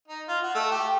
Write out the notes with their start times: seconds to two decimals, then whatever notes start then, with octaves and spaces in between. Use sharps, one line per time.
0.08 D#4
0.28 F4
0.43 F#4
0.55 A3
0.72 G4